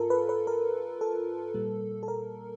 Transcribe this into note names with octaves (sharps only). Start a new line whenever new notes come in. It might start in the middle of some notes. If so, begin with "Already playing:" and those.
Already playing: G#2 F4 A4 A#4
B4
B4
A#4
A4
A#2 G3 A#3
A4
A#4